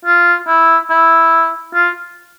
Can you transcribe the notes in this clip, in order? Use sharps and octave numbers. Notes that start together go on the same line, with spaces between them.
F4
E4
E4
F4